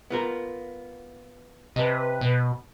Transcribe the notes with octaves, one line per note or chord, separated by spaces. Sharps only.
B3 F4 A#4
C3 B4 D#5 A5
B2